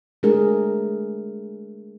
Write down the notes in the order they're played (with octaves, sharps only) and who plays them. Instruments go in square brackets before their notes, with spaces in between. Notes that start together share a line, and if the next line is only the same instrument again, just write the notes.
[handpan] G#3 A3 D4 G#4 A#4